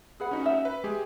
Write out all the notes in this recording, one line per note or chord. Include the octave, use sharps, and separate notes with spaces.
G#4 B4 F#5
C#4 D#4 F#4
E5
B4
G#3 G4 G#4